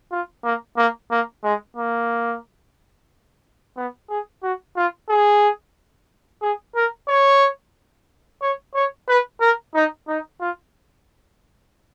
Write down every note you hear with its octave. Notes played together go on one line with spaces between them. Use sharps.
F4
A#3
A#3
A#3
G#3
A#3
B3
G#4
F#4
F4
G#4
G#4
A#4
C#5
C#5
C#5
B4
A#4
D#4
D#4
F4